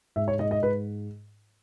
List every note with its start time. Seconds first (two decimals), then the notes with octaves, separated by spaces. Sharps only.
0.16 G#2 E5
0.28 C#5
0.39 G#2 D#5
0.51 D#5
0.62 G#2 B4